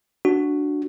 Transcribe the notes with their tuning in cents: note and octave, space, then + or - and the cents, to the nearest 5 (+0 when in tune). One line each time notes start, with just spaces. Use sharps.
D4 +0 F#4 +0